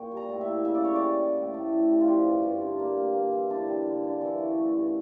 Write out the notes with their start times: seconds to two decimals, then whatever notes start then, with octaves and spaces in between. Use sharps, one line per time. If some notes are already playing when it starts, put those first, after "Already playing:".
Already playing: A#2 C#5 G5
0.12 G3
0.17 A#5
0.29 A2
0.41 E5
0.48 A#3
0.65 C#3 E5
0.75 D5
0.83 C#4 C#5
0.95 D5
1.01 G3
1.19 G3
1.36 A2
1.54 A2
1.72 A2
1.89 G3
2.01 F4
2.08 F3 G4
2.26 G2
2.43 G2
2.61 D3
2.79 A#3
2.97 A#3
3.14 A#3
3.32 E3
3.50 D3 D4
3.68 G3
3.86 D3
4.04 D3
4.21 E3
4.40 C#4
4.58 A3
4.75 G2